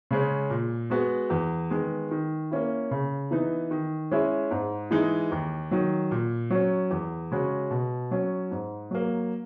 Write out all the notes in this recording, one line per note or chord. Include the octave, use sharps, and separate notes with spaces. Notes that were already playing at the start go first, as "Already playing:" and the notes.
C#3 G#3 C#4
A#2
G#3 B3 F#4
E2
D#3 G#3 B3
D#3
A#3 C#4 E4
C#3
E3 B3 D#4
D#3
G#3 C#4 E4
G#2
E3 G#3 D#4
D#2
D#3 F#3
A#2
F#3 C#4
E2
C#3 G#3 C#4 F#4
B2
F#3 C#4
G#2
F#3 A#3